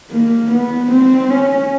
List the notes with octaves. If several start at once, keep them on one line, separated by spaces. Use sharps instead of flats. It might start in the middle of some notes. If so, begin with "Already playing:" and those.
A#3
B3
C4
C#4